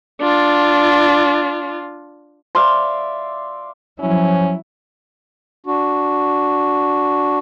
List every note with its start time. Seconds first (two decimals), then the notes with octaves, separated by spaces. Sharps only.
0.21 D4 F4
2.55 D5 E5 F5 C6
4.00 F3 F#3 C#4 E4
5.66 D4 F#4